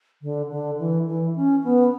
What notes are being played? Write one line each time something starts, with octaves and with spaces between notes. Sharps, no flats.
D3
D3
E3
E3
C#4
B3